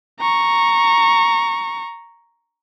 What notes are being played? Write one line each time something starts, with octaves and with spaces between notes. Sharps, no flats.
A#5 C#6